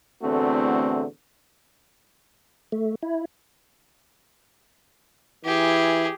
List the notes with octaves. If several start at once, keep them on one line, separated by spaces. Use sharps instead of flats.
E2 A2 D3 A3 C4 F#4
A3
E4
E3 G4 G#4